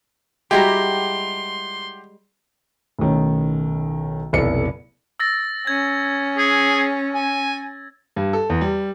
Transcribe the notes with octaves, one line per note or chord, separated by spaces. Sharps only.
G3 G#3 E4 F#4 G4 A#5 C6
B1 A2 D#3 C#4
F1 B1 B2 E4 D5 C#7
E6 A6 A#6
C#4 G#6
G#4
G#5
G2
A4
E2
G3